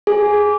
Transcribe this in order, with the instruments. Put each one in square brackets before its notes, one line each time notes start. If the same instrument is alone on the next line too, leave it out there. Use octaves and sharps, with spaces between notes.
[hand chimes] G#4